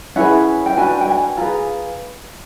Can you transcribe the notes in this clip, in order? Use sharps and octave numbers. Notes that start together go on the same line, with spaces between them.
C#4 E4 G#4 B4 F#5
G5
D4 F#4 B4 G#5
G5
G#5
F4 G#4 B4 A#5